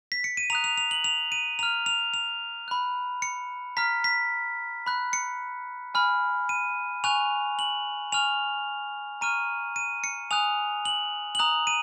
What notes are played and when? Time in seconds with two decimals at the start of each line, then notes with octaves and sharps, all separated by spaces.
0.12 B6
0.24 C#7
0.37 D#7
0.50 A#5 D#6 F#6 F7
0.64 F7
0.78 F7
0.91 F#7
1.04 F7
1.32 D#7
1.59 A#5 F6 F7
1.86 F7
2.14 F7
2.68 B5 F#6
3.22 C#7
3.77 A#5 F6 B6
4.04 B6
4.86 B5 F#6
5.13 C#7
5.94 G#5 B5 F6
6.49 D#7
7.04 G#5 C#6 F#6 F7
7.59 F#7
8.12 G#5 C#6 F6 F7
9.21 A#5 C#6 F6 D#7
9.76 D#7
10.04 C#7
10.31 G#5 D#6 F#6 F7
10.85 F#7
11.35 F#7
11.39 A#5 D#6 F#6 F7
11.67 D#7